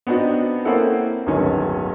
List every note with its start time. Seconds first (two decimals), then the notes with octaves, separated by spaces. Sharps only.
0.07 B3 C4 D4 D#4 F#4
0.65 A#3 C4 C#4 E4 A4 F#5
1.27 D1 G1 D#3 C#4